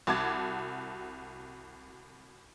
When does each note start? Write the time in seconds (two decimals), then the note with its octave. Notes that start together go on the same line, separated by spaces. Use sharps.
0.07 C2 F#4 A5 D6 G#6